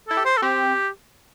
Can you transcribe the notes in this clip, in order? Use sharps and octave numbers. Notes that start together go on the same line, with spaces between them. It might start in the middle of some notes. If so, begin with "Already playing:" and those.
E4 A4
G4
C5
A4
C4 G4